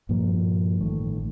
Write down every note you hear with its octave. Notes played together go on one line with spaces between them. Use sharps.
G2 A#2 F3 A#3
A1 D#3 A3